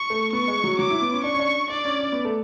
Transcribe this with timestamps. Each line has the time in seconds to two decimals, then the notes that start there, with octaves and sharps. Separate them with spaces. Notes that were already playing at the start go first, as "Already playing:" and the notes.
Already playing: C#6
0.10 A3
0.33 B3 C#6
0.48 G#3
0.64 F#3
0.79 F#3 D6
0.91 E4
1.02 B3
1.13 C#4
1.24 D4 C#6
1.34 C#4
1.39 D4
1.70 D4 D5
1.85 C#4
2.00 C#4
2.12 B3
2.25 A3